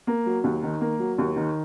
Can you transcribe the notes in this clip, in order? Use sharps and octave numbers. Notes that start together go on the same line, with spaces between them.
A#3
F#3
D#2
D#3
A#3
F#3
D#2
D#3